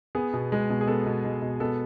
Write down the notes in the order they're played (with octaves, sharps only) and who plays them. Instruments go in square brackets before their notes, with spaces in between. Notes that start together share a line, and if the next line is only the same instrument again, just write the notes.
[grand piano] B3 G#4
B2
G#3
B2
G#4
B3 A4
B2
G#3
B2
B3 A4